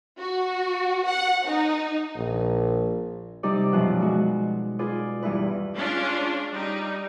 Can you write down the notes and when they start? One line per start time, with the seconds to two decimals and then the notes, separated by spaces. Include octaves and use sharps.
0.19 F#4
1.08 F#5
1.47 D#4
2.15 A#1
3.43 C3 G3 D#4 G4 D5
3.72 F#2 B2 F3 F#6
4.00 G#3 F#4
4.79 F4 G#4 B4 D5
5.22 E2 G2 E4 B4
5.75 G#3 C#4 D4 F4
6.54 G3 D#4